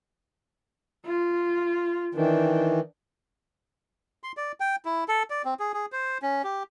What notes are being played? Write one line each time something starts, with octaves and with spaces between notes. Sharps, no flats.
F4
D#3 E3 D4 G5
C6
D5
G5
E4
A4
D5
C4
G#4
G#4
C5
C#4
G4